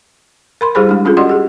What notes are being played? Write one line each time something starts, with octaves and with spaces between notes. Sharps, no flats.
A#4 B5 C6
G3 E4 G4 G#4 C5 B5
G#3 D4
C#4 F4 G#4 A4
F#4 G4 D5 D#5 F#5 C6
G4 G#4